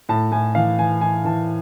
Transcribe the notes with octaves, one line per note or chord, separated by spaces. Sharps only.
A2 A5
A2 G#5
E3 F5
E3 G#5
E3 G#5
E3 A5